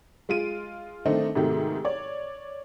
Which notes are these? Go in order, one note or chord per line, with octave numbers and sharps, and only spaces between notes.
G#3 F4 D7 D#7
D#3 A3 C4 D4 D#4
G#2 C3 D#3 A3 F#4 G4
C#5 D5